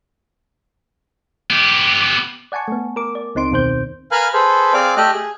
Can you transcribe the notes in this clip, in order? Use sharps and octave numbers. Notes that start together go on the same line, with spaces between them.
B3 G4
D5 F#5 G#5 A5 C#6
A3 B3
A#4 D6
D5
C#2 C4 D#4 C6 D7
E2 B2 D#3 C4 C5 G6
A#4 B4 F5 G#5 F6 F#6
G#4 A4 B4 C5
C4 G#4 D5 F5 D6
A3 G4 D#5 E5 F6 F#6
G#4